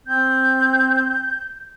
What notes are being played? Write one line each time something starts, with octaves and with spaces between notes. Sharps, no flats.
C4 G6